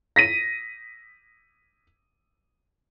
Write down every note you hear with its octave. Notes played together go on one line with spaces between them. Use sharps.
A#6 B6 D#7